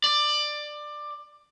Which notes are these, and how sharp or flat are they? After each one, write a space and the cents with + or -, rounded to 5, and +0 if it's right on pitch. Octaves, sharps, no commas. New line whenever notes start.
D5 +20